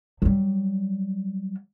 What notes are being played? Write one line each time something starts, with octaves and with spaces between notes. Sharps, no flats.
F#3 G3